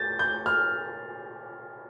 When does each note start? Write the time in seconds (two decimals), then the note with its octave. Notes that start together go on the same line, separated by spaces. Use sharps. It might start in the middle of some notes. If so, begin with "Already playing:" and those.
Already playing: G6 A6
0.19 G6
0.46 F6